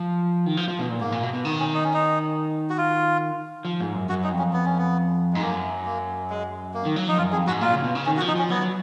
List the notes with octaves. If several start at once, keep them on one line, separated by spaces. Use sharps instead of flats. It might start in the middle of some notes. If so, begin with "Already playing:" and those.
Already playing: F3
D#3
F3
F3
B2
A#2
G#2 A#3
A#2
B2
B2
D#3 B3
C#4
D#4
C#4
D#4
F#4
F4
F3
G#2
F#2
F#2 F#4
D#4
F2
C#4
B3
C#4
B3
G#2 G#3
F#2 A#3
A#3
G#3
A#3
D#3
F#3
F3 D#4
F#2 F4
F2 G#4
G#2 F#4
A#2 F4
C#3
B2
C#3
D#3 C#4
F#4
F3
D#4
F3 C#4
F#3 B3
F#3